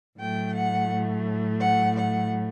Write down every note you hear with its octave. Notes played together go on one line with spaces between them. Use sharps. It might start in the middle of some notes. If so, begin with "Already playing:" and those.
A2 F#3 A3 G5
F#5
F#5
F#5